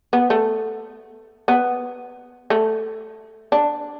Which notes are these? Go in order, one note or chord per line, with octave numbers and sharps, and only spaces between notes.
B3
A3
B3
A3
D4